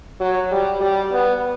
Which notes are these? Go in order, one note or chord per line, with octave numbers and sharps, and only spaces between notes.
F#3
G3
G3
B3